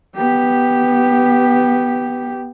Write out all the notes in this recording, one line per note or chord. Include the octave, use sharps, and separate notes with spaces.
B3 G4